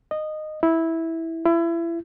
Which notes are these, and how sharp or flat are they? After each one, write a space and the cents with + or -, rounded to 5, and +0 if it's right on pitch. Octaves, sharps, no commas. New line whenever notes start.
D#5 -15
E4 -10
E4 +30